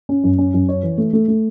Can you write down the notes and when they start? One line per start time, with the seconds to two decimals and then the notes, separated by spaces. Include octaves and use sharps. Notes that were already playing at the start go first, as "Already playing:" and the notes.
0.09 C#4
0.24 F#2
0.38 C#4
0.54 F#2
0.69 C#5
0.83 E3
0.98 A3
1.13 A3
1.28 A3